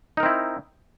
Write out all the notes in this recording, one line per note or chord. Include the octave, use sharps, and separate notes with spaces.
C4 D#4 E4 A#4